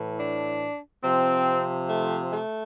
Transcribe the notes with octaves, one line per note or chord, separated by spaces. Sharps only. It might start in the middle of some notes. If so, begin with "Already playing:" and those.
Already playing: A2 E3
D4
C3 F3 C4
A3
A3